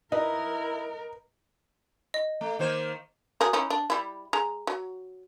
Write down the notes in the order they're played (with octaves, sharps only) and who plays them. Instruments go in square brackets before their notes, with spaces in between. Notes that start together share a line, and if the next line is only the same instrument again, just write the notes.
[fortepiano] D#4 [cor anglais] E4 [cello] A#4 [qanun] B4
[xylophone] D#5
[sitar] A3
D#3 A#3 C5
[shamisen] F#3 G#4 A#4
C#4 D#4 E4
D4
G3 E4
G#3 A#5
F#3